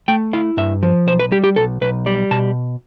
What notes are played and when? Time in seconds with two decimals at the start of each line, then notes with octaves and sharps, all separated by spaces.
0.08 A3 G5
0.33 E4 F5
0.57 G2 E5
0.83 F3
1.07 B1 C5
1.19 B4
1.32 G3 G4
1.44 G4
1.56 B1 A4
1.81 B1 B4
2.06 G3 D5
2.31 B2 A5